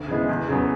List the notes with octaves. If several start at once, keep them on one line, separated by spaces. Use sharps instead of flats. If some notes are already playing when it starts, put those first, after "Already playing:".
Already playing: D2
C#3 E3 G#3 B3
E2
C#3 F#3 B3